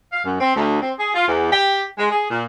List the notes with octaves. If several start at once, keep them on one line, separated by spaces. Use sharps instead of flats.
F5
F#2
C4
D2
C4
G#4
F4
E2
G4
G#3
G#4
A#2